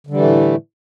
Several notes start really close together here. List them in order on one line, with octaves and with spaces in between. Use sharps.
D3 G3 E3 A3 A2